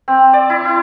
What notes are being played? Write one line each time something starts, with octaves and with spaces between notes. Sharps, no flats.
C4
D5
E4
E4